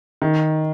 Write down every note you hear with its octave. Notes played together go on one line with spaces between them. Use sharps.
D#3